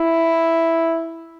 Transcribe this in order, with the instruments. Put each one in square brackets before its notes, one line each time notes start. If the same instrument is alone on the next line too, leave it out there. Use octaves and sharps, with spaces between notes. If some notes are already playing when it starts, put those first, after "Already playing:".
Already playing: [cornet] E4